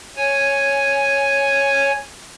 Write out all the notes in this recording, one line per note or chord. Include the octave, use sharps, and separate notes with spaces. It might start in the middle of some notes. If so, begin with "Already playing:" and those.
C#5 G#5